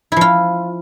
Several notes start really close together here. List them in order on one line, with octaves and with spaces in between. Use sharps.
E4 F3 F4